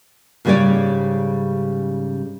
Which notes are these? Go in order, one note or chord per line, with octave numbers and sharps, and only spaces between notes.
G#2 C#3 G3 C#4 C#5 D5